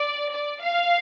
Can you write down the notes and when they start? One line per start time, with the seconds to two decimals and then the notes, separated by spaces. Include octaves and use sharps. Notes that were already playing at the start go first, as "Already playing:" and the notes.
Already playing: D5
0.32 D5
0.61 F5